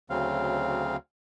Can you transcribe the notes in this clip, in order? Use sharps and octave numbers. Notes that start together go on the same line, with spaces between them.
D2 C#3 F#3 C4 F5